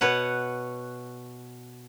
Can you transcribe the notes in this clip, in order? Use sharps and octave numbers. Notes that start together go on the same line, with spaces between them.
B2 B4 C#5 F#5